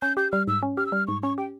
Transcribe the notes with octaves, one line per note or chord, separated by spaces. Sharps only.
C#4 G6
G4 G6
G3 F6
G#2 E6
C#4
G4 F6
E6
G3 F6
G#2 C#6
C#4 C#6
G4 G5